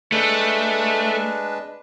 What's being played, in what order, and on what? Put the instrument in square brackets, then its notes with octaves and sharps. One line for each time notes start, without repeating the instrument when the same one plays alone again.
[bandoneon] G#3 D4 B4 [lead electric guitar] A3